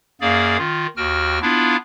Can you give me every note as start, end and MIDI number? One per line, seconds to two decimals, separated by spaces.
0.21 0.57 42
0.21 0.57 58
0.21 0.57 68
0.21 0.57 74
0.21 0.57 77
0.58 0.87 51
0.58 0.87 65
0.97 1.39 39
0.97 1.39 66
0.97 1.39 79
0.97 1.39 89
1.42 1.76 59
1.42 1.76 62
1.42 1.76 64
1.42 1.76 65
1.42 1.76 77